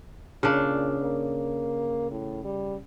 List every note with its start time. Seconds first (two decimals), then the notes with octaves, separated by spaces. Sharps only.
0.43 A#2 C#3 D4
1.01 A#3
2.11 A2
2.45 G3